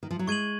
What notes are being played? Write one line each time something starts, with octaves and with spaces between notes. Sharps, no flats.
D#3
F3
F#3
G#3 C#6 G#6 D#7 F#7